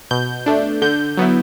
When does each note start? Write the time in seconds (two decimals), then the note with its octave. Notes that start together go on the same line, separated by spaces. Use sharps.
0.11 B2 G6
0.46 A3 D4
0.82 D3 G6
1.17 F#3 B3 E4